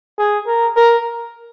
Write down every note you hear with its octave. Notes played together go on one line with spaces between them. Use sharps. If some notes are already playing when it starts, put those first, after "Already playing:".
G#4
A#4
A#4